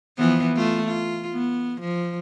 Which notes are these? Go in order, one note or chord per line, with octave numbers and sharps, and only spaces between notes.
E3 F3 B3
A3 F4
F4
B3
F3